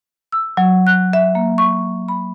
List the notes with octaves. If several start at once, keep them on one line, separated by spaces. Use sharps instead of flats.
E6
F#3
F#6
E5
A#3
C#6
B5